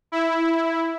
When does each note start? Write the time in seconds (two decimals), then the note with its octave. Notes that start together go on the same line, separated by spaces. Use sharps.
0.12 E4